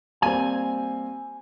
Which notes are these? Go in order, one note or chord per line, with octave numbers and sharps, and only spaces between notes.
G3 A#3 C4 G#5